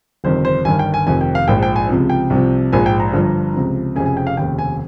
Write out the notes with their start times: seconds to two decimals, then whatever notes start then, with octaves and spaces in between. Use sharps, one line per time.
0.24 G1 F2 C3 D#3 C5
0.45 C5
0.65 G1 G2 D#3 G#5
0.79 G5
0.94 G#5
1.06 F1 F2 D#3 G#5
1.21 G5
1.35 F5
1.48 A#1 G#2 F3 G5
1.63 G5
1.76 G#5
1.89 C#2 C3 F3
2.10 G5
2.30 C2 C3 F3
2.72 A#1 G#2 F3 G#5
2.86 G5
3.00 A#5
3.13 G1 G2 F3
3.54 C#2 C3 F3
3.96 F1 F2 C#3 G#5
4.06 G#5
4.17 G5
4.27 F5
4.37 F1 D#2 C#3 G5
4.59 G#5